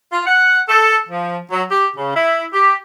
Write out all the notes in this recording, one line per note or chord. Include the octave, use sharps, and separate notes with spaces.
F4
F#5
A4
F3
F#3
G4
C#3
E4
G4